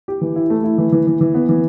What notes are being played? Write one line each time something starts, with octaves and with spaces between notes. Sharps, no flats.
G4
E3
E4
A3
E4
E3
E3
E3
E3
B3
E3